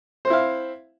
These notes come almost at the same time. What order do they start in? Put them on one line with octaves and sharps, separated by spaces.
C5 C4 E4 F5